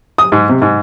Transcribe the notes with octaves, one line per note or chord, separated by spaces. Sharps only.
D#6
G#2
C3
G#2